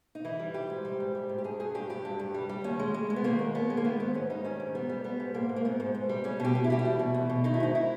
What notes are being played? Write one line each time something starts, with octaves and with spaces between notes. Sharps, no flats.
D#4
E3 E4
G3
E3 G4
G#2
G3
G#2
G3
G#2
G4
G2 G#4
G2 G#4
G2 G4
G2 G4
G2
G2
G3
G3
D#2 C#4
G#3
G#3
G#3
B3
D#3 A#3
D#2
D#2 B3
G#3
A#3
D#3 B3
G#2 B3
G#2 C#4
G3 D#4
D#3 C#4
G#2
G3 B3
G3
G3 B3
G#2
G#2 A#3
G#2
A#3
G#2 B3
G#2
G#2
G3
G3 C#4
B2 G4
B2
E4
G3 G4
E4
E2
B2
E2
B2
D#3 D#4
E4
G#2 D#4
E4